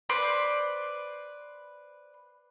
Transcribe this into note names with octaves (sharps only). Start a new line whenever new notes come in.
B4 C5 D5 B5